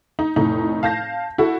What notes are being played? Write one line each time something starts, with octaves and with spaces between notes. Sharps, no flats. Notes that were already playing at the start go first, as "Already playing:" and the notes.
D#4
F1 A2 D#4
F5 A5 G6 A#6
E4 F#4 A4